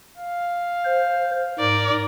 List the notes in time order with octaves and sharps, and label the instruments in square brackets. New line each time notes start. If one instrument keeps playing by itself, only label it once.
[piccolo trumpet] F5
[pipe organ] C5
[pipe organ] G#2 [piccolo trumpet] A#4 [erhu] D5